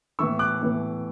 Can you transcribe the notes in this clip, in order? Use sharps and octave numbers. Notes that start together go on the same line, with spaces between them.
A2 E3 B3 C#6 E6
D6 F#6
A2 E3 B3